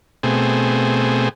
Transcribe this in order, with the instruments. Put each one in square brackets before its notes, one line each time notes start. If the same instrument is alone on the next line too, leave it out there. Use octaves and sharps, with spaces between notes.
[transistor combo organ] B2 A3 C4 G#4